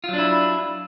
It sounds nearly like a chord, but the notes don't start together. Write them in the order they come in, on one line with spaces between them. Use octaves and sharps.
F4 F#3 D4 E4